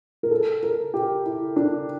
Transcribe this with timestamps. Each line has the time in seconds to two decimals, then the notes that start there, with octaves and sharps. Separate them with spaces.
0.23 A#4
0.31 A4
0.63 A#4
0.94 G4
1.26 E4
1.56 D4